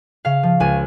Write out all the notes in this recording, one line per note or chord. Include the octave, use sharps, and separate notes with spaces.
C#3 F5
F3
C#2 G#5